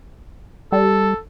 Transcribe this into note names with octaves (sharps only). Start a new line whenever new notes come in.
G3 A4